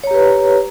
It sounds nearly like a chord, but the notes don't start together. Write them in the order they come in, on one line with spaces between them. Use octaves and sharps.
C#5 A#5 G4 B4